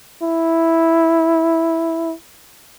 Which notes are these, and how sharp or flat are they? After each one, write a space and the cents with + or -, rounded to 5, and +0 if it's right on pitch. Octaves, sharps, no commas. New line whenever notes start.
E4 -5